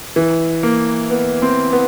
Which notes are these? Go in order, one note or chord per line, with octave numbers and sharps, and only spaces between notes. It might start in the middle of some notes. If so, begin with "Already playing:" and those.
E3
A#3
B3
C4
B3